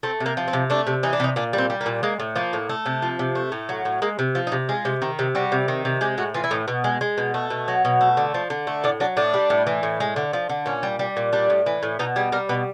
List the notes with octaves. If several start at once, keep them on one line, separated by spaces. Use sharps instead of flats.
A3 C4
C3
A#3
F3
C4
C3
A3 D4
C3
E3 D#4
D4
C3 D#4
A#2 D4
G3
C4
G3
A#3
A#2
G#3 A#3
A2
F3 A#3
A2
A3
C3
F3
C3
A3
A2
F#3
A2
G#3 A#3
C3
F3
D#4
C3
G#3 F4
C3
D#3
C3
G3 F#4
C3
D#3
C3
G#3 G4
A2 F#4
E3 F4
E4
A2 D#4
B2
G#3
G#3
B2
A3
B2
F#3
B2
A3
D3
F3
D3
A3
A2 D4
F#3 D4
A2 D4
G3
A2
E3
A2
G#3
D3
F3
D3
A#2 C#4
G3
G3
A#2
G3 D4
A2
E3
A2
B2 D#4
G3 G#4
G3 A#4
B2 B4